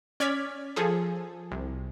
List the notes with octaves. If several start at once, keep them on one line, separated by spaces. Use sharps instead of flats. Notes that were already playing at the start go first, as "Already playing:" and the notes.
C#4 D5 F6 G#6 B6
F3 G#4 A4
C2